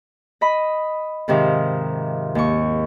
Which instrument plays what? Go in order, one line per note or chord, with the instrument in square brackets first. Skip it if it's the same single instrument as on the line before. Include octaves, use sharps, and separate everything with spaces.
[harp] D#5 B5
G#2 C3 D#3 F3
D#2 C#6